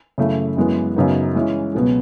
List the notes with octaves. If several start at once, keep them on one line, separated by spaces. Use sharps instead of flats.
F#2 C#3 E3 A3 E4
F#2 E3 G#3 B3
F#2 C#3 F#3 B3 D#4
E3 G#3 C#4 E4
C#2 B2 F#3 B3